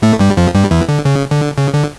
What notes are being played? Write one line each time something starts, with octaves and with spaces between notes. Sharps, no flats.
A2 A3
G2 G3
F2 F3
G2 G3
E2 E3
D3
C#3
D3
C#3
D3